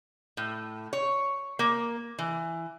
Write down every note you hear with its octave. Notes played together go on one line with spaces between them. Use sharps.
A2
C#5
A#3
E3